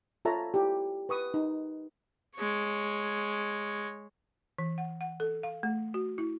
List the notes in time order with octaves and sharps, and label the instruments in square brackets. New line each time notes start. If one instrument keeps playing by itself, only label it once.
[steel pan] F4 A4 C#5 E5 A5 A#5
E4 G4
B4 C#6 D#6
D#4
[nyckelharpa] G#3 C#5
[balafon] E3
F#5
F#5
A4
F5
A3
F#4
E4